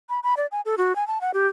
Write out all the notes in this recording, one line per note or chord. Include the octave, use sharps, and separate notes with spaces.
B5
B5
D5
G#5
A4
F#4
G#5
A5
F#5
G4